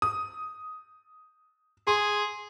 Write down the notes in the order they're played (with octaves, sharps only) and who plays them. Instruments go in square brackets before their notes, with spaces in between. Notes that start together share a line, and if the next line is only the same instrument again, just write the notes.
[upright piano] D#6
[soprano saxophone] G#4 [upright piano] C6